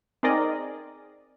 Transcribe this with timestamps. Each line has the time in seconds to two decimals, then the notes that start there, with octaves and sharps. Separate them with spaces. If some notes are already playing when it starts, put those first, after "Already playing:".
0.23 C4 D#4 G#4 A#4 D5 D#5